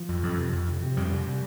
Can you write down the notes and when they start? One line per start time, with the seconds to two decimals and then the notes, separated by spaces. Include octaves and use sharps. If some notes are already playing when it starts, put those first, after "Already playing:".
Already playing: F3
0.08 F2
0.23 F2
0.38 C3
0.53 F2
0.68 C3
0.82 C3
0.97 F2 G3
1.11 C3
1.26 C3